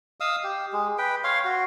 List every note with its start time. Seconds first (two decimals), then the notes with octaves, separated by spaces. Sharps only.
0.20 D#5 F5 D#6 E6
0.44 G4
0.73 G#3
0.98 B4 G5
1.24 C#5 F5 C6
1.44 F#4